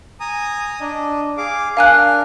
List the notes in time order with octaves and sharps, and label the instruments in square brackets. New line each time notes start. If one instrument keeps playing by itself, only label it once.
[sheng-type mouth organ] G#5 A#5 D#6
D4 D#5
G#4 F5 D6
[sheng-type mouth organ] D4 A#4 F6 [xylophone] F5 G#5 F#6